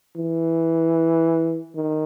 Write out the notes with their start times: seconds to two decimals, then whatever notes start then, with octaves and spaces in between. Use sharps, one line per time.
0.17 E3
1.75 D#3